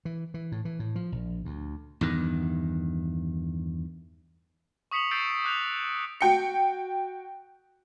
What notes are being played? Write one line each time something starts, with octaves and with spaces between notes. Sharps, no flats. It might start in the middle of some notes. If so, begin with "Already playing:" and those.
E3
E3
A2
E3
A2
F3
A#1
D2
E2 G2 D#3
C#6 D#6 B6 C#7 F7 F#7
E6 G6 A6 C7 D7
D6 F#6 G6 F7
F#4 G5 C#7